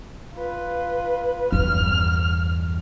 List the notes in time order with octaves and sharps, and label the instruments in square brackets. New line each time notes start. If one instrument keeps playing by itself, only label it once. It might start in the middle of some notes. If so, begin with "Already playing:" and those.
[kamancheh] F4 B4
[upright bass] E2 G2 [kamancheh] F6